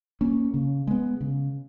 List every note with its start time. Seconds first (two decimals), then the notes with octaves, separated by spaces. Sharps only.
0.21 A#3 C#4
0.54 C#3
0.87 G#3 B3
1.21 C#3